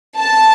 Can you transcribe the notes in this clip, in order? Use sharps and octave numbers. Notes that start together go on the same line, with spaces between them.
A5